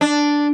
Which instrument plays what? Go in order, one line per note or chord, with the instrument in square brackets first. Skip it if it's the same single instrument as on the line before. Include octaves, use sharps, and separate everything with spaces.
[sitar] D4